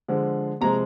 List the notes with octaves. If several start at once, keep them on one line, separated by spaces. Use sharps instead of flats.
D3 F3 G#3
C3 F3 G#3 A#5